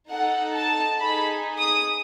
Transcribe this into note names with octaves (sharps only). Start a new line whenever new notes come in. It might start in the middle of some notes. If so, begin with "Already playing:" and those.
D#4 A4 F#5
A5
D#4 G#4 B5
D#6